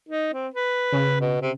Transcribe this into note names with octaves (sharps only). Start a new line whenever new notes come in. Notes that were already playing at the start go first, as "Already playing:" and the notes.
D#4
C4
B4
C#3
B2
C3